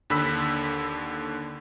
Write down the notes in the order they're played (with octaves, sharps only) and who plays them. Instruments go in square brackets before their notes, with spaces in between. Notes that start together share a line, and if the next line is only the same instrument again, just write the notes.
[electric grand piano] D#2 D3 B5 E6 B6